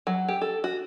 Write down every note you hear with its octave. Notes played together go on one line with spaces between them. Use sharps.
F#3
G4
A4
F#4